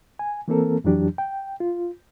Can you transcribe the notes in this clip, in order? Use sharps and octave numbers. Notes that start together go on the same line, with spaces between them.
G#5
E3 A#3 C4 A4 A#4
F2 E3 F#3 D4 G4
G5
F4